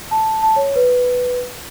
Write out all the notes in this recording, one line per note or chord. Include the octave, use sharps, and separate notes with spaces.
A5
A5
C#5
B4